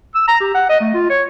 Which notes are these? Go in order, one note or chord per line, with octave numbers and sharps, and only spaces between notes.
E6
A#5
G4
F#5
D#5
A3
F4
C#5